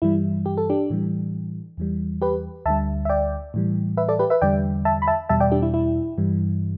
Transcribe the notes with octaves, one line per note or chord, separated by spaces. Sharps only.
G2 E3 G3 E4
G4
A4
D4 G4
A2 E3 G3
E2 E3 G3
G4 B4
D2 D3 G3 E5 A5
E5
D5 G5
A2 E3 G3
B4 E5
A4 D5
G4 B4
B4 E5
E2 D3 G3 D5 G5
E5 A5
B5
E5 A5
E2 B2 G3 E5 A5
D5 G5
D4 G4
E4
E4
G2 E3 G3